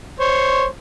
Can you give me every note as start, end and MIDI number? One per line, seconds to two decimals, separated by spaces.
0.20 0.65 72
0.20 0.65 73